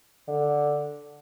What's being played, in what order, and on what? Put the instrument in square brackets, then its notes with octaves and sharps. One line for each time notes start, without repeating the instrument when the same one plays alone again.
[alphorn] D3